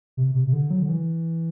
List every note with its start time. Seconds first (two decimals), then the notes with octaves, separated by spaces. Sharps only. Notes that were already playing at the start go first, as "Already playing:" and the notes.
0.17 C3
0.35 C3
0.48 C3
0.53 D3
0.71 F#3
0.82 D3
0.89 E3